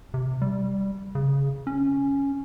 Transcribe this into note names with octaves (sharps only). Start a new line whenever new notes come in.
C3
G3
C#3
C#4